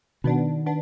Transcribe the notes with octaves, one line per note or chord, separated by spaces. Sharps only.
B2 D#3 B3 D4
B3 D4